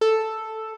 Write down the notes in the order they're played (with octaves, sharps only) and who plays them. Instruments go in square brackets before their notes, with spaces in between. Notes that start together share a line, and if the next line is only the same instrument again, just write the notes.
[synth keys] A4